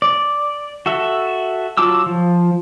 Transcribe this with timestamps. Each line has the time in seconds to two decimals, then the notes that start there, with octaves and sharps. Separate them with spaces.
0.02 D5
0.86 F#4 A4 E5
1.77 F#3 F4 A5 D6 E6
2.06 F3